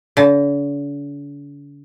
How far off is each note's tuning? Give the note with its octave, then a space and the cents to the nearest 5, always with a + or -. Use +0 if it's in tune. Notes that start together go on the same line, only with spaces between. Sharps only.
D3 -45